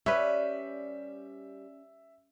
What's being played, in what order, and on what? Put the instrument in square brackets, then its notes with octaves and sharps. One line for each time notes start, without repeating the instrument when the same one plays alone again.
[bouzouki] G3 [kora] C#4 B4 [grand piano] E5